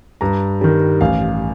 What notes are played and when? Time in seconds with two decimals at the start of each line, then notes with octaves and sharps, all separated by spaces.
0.21 G2 A#5
0.61 D#3 G3
1.01 A1 F5